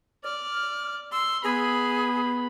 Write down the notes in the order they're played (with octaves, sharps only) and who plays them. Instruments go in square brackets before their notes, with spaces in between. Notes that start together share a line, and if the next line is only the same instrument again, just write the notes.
[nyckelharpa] D5 [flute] F6
[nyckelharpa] C6 [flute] E6
[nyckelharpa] B3 B5 [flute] G#4